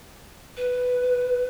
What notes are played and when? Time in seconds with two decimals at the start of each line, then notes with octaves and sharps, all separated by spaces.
0.57 B4